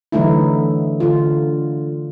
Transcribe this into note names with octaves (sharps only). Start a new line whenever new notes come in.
D3 E3 F#3 A3 D#4 E4
D3 F4